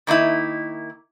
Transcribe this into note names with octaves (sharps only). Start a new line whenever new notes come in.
D#3 A#3 D#4 E4